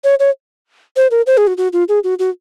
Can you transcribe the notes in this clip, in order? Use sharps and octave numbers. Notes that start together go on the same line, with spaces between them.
C#5
C#5
C5
A#4
C5
G#4
F#4
F#4
F4
G#4
F#4
F#4